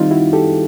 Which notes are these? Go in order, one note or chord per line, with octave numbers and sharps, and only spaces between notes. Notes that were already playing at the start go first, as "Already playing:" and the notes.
Already playing: D#3 G3 C4 D#4 F4
E4 F#4
G4 A4